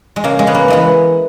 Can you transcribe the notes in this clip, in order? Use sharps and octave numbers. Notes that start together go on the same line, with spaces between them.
G#3
C#3 A#3
G#3
C#3 B3
A#3
E3 G#3 B3